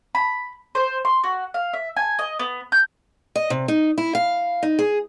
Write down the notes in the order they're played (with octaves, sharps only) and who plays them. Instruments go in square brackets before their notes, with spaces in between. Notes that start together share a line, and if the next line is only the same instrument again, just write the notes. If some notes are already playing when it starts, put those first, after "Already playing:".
[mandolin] B5
C5
C6
F#4
F5
E5
G#5
D#5
B3
G6
[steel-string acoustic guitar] D#5
C3
D#4
E4
F5
D#4
G#4